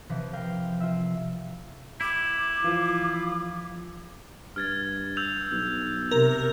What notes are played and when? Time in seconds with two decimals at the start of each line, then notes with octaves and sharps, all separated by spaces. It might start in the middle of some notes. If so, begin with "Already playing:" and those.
0.09 C3 E3 F3
0.33 A#4 F5 G5
0.80 F4 E5
2.01 E4 D6
2.64 E3 F3 F4
4.56 G2 F6 G#6 A6
5.17 E6 G6 F7
5.51 B1
6.11 C3 A#4